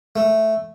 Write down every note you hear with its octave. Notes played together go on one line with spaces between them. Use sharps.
A3